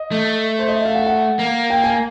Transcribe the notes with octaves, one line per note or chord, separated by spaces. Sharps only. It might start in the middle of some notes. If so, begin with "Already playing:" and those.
Already playing: D#5
A3
C5
D#5
E5
F5
F#5
F#5
A#3
G5
G#5